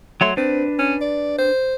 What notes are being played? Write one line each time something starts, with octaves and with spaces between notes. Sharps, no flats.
F#3 A3 C#5 C6
C4 D4 B4
C#4
D5
C5